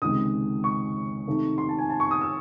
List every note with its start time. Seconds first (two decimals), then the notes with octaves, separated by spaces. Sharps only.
0.02 C#2 C3 D#3 G#3 D#6
0.64 C#6
1.27 C3 D#3 A3 D#4
1.58 C6
1.69 A5
1.78 G#5
1.90 A5
2.00 C#6
2.11 D#6
2.21 E6